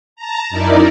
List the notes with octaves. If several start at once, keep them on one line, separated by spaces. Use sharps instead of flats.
A5 A#5
F#2 D#4 E4 A#4 D5